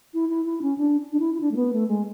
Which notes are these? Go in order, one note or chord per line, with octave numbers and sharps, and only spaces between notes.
E4
E4
E4
C#4
D4
D4
E4
E4
D4
A3
B3
A3
G#3